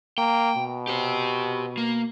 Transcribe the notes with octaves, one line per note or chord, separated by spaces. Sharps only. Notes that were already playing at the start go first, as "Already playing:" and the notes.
A#3 G5
B2
G4 C5
A#3